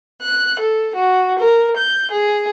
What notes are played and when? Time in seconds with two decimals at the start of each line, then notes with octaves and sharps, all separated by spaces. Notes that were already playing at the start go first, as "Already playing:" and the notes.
0.22 F#6
0.59 A4
0.94 F#4
1.39 A#4
1.77 G6
2.11 G#4